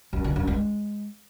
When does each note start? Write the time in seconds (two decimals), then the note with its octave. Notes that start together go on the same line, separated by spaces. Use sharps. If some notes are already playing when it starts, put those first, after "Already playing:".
0.13 F#2
0.24 D3
0.36 F#2
0.47 G#3